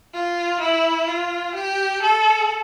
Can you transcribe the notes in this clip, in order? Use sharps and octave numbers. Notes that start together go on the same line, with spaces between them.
F4
E4
F4
G4
A4